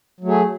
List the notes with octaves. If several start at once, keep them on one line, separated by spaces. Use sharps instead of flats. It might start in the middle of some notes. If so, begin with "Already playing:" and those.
F#3 A3 G#4